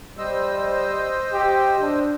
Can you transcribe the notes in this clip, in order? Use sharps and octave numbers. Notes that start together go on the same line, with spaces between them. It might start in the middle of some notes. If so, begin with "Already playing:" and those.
G3 C5 D#5 E6
G4
D4